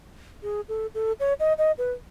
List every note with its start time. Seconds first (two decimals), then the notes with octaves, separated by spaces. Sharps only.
0.43 G#4
0.69 A4
0.95 A4
1.20 C#5
1.40 D#5
1.58 D#5
1.78 B4